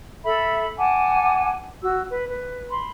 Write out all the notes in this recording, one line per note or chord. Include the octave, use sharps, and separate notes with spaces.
A4 E5 B5
F#5 G#5 A5 D6
F#4 E6
B4
B4
B5 C6